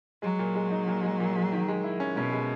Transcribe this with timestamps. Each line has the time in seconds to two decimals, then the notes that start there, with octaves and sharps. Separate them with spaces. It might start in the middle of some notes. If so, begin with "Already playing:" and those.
0.22 F#3 G#3
0.39 A#2
0.55 G#3
0.71 D#4
0.87 A#2
1.03 G#3
1.20 A#2
1.36 G#3
1.52 D#3
1.68 G#3
1.84 E4
2.00 C#4
2.16 B2 C#4
2.32 G#3